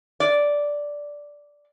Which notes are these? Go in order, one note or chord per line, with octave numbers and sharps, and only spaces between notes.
D5